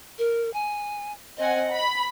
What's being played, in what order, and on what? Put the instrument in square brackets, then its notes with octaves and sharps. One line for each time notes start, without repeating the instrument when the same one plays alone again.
[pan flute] A#4
G#5
[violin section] C4 F#5 G#5 [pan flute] D#5
[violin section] B5